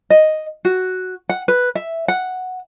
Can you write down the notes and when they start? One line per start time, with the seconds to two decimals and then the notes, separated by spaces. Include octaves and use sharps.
0.10 D#5
0.65 F#4
1.29 F#5
1.48 B4
1.75 E5
2.08 F#5